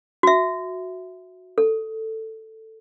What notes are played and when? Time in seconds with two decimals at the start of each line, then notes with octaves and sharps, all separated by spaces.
0.23 F#4 E5
1.58 A4